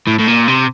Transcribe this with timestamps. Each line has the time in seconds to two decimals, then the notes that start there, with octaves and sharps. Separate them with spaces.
0.07 A2
0.19 A2
0.28 A#2
0.48 C3